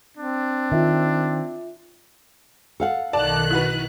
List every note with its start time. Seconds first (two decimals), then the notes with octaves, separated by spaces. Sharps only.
0.17 C4 D4
0.72 D#3 F4 E5
2.80 A4 F5 F#5
3.13 B1 D#3 D5 A5 F#6
3.51 E4 F#4 B4